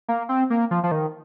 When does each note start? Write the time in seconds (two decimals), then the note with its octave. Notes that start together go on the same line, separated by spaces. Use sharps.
0.08 A#3
0.29 C4
0.50 A#3
0.71 F3
0.84 F3
0.92 D#3